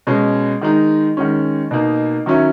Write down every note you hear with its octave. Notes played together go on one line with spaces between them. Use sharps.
B2 G#3 C#4
D#3 G#3 D#4
D#3 G#3 C#4
B2 A#3 D#4
D#3 F#3 C#4 E4